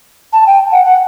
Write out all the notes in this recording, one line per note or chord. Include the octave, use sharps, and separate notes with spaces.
A5
G5
F#5
F#5